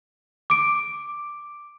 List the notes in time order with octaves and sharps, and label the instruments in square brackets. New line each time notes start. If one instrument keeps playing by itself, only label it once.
[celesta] D6 D7